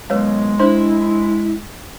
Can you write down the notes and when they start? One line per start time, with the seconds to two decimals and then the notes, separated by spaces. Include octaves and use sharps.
0.10 F#2 B2 G#3 B4 C#5 F5
0.59 D4 E4 C5 C6